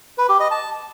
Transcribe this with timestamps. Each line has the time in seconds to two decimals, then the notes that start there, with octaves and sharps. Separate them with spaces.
0.18 B4
0.29 G4
0.40 D#5
0.51 A5